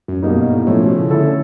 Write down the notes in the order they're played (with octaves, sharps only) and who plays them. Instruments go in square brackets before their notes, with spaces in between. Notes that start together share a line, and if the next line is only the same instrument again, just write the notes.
[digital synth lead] F#2
[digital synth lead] F#2 [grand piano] B2 G3 A#3 D#4
[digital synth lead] G2
A2
[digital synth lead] A2 [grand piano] F3 A3 C#4 E4
[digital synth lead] B2
C#3
[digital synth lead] D3 [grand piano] A3 C#4 E4 A4